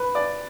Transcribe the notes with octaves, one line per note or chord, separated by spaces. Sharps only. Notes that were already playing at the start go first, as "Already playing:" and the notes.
Already playing: B4
D5